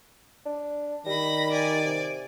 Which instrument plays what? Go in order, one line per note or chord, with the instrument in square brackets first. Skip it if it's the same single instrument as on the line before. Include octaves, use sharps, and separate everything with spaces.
[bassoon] D4
[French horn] D#3 [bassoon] G3 [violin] B5 A#6
[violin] D5 G#5
[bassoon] C3